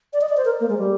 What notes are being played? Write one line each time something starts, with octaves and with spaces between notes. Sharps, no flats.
D5
D#5
D5
C5
A#4
A#3
G#3
G3